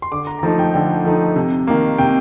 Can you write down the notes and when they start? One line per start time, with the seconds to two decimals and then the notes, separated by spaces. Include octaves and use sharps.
0.02 C6
0.12 D3 D6
0.27 A#5
0.39 A#5
0.43 F3 A3 D#4 A5
0.59 G5
0.74 D3 G5
1.05 F3 A3 D#4
1.36 C3
1.67 D#3 A#3
1.98 C3 G5